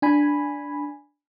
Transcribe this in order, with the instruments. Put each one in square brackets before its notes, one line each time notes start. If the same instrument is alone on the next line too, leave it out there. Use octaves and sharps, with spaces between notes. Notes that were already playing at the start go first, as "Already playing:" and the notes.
[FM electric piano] D4 G#5 B5